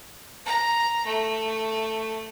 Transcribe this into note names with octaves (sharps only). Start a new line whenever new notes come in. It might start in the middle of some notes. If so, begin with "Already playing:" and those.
A#5
A3